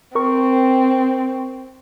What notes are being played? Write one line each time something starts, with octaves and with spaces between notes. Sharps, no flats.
C4 A#4 C#6